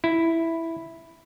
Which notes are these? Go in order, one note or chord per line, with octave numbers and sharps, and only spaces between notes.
E4